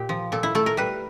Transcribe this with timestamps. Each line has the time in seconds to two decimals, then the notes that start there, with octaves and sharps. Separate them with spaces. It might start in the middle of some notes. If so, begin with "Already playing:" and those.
Already playing: A#2 G4
0.09 F3
0.32 A#2 A4
0.43 E4
0.55 A3 A4
0.66 A#4
0.77 G3 B4